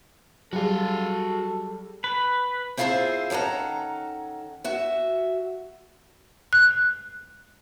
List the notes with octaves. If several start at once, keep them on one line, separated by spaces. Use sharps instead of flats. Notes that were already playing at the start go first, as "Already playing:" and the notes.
F#3 G3 F#4 G#4 A4 F5
B4
C4 E4 F4 G#4 A#4 C5
D#3 C#4 A4 F#5 A#5
F#4 E5
F#6